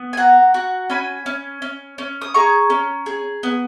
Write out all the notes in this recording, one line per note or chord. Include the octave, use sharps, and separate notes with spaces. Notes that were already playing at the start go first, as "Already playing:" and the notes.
Already playing: B3
G#5
F#4 F#5 A#5
F#4
C#4 G#5 B5
C#4
C#4
C#4
D#6
G#4 A#5 C#6
C#4
G#4
B3